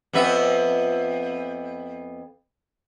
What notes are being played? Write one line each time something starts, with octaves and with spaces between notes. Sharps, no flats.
F2 B3 E5